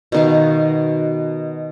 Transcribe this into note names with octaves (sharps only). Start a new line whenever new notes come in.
B2 D#3 F5